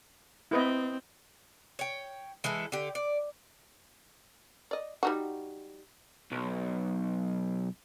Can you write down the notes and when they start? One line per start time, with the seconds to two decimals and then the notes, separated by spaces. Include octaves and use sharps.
0.51 C4 E4 B4 D#5
1.79 C#5 G5
2.44 E3 G#3 E4 A4
2.72 D3 G4
2.95 D5
4.71 D5 D#5
5.03 G3 D#4 F#4
6.32 B1